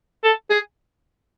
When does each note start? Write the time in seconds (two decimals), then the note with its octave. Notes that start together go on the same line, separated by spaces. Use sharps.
0.24 A4
0.50 G#4